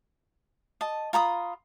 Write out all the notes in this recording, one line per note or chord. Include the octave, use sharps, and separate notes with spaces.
D#5 A5
F4 A#5 B5 D#6